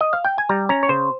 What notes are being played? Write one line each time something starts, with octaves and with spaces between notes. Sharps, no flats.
D#5
F5
G5
G#5
G3 A#5
C#4 A#5
C#5
C#3 C5